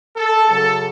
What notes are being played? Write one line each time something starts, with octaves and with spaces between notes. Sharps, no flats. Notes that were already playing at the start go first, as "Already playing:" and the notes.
A4
F#2 C#3 F#3 A4